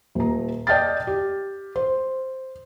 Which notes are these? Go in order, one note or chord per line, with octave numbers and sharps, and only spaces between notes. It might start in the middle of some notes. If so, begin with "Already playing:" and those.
D#1 A#5
D5 D#5 G5 A5 F6 A6
G4
C5